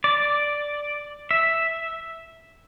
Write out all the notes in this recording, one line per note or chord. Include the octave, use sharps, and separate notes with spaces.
D5
E5